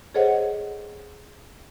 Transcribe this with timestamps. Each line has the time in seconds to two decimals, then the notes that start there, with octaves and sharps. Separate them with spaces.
0.14 G#4 A4 C5 C#5 D#5 F#5